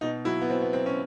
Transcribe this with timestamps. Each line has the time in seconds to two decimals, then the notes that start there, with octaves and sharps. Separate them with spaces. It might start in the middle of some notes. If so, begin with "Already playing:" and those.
0.01 B2 D#4
0.25 F#3 E4
0.41 B3
0.49 B2 C4
0.62 B3
0.73 F#3 C4
0.86 C#4